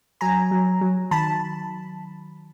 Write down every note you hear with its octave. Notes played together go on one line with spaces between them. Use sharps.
F#3 G#5 A#5
F#3
F#3
D#3 A5 B5